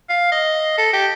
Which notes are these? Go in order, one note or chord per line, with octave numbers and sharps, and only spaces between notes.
F5
D#5
A4
G4